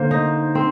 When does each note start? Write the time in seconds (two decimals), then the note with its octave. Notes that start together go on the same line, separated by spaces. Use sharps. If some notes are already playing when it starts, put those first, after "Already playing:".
Already playing: D3 A#3 C5
0.11 D#4
0.55 C4